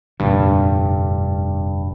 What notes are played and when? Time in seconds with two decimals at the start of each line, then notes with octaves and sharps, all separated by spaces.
0.20 F1 G2 A#2 D3